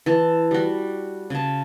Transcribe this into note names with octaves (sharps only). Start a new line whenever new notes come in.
E3 A5
G3 F#4
C#3 A5